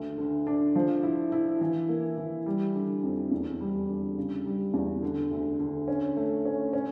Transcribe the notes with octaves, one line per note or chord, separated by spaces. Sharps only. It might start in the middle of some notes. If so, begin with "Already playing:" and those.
Already playing: D2
D3
D4
F3
E4
E4
E3
A#3
E3
G3
D3
F2
E2
G3
D3
C#3
G3
E2
D3
D2
D3
C#4
A3
C#4
C#4